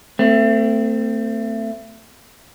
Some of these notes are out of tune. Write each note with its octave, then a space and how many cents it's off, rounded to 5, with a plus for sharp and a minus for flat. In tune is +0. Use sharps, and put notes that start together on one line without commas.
A3 +25 C4 -20